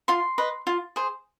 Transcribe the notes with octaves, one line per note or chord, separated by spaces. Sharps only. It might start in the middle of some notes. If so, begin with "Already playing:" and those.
F4 C6
B4 D#5
F4
G#4 C5